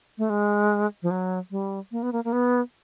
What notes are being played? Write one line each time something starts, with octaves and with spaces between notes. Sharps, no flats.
A3
G#3
F3
F#3
G3
A#3
B3
A#3
A#3
B3